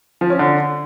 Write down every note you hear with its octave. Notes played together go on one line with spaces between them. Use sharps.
F3
C#4
D3